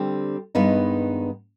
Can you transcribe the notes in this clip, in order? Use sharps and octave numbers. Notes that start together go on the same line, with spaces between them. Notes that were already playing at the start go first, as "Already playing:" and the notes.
Already playing: D3 G3 C4
G2 D#3 G#3 B3 D#4